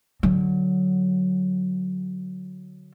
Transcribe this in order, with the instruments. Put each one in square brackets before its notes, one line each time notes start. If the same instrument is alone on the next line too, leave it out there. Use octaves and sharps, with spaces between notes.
[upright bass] D3 F#3